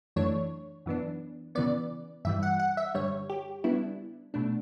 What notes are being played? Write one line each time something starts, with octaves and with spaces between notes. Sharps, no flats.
F#2 E3 A3 D4 C#5
F#2 E3 B3 D4
C#3 E3 B3 D5
G2 E3 G3 E5
F#5
F#5
E5
G2 D3 G3 C#5
G4
C#3 G3 B3 D4 E4
B2 A3 D4